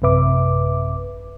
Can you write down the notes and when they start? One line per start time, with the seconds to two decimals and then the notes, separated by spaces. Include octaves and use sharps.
0.02 A1 F#2 C3 B4 E5 D6